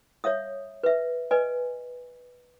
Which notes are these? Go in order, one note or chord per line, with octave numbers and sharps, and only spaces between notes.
C#5 E5 F5 D#6
B4 E5
B4 D#5 G#5